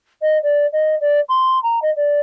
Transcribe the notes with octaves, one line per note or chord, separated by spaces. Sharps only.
D#5
D5
D#5
D5
C6
A#5
D#5
D5